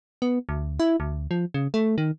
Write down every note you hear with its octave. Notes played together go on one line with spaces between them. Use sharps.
B3
D2
E4
D2
F3
C#3
A3
D#3